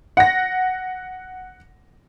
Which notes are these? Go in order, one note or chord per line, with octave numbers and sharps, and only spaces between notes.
F#5 A#6